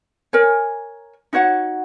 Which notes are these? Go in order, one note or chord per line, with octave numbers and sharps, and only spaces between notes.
A#4 C#5 G#5
D#4 F#4 C#5 F#5